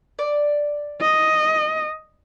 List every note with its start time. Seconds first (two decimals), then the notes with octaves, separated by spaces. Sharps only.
0.19 D5
1.01 D#5